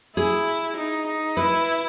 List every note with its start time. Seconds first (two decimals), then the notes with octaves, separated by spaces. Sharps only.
0.17 E4 G#4
0.77 D#4
1.07 D#4
1.36 E4 B4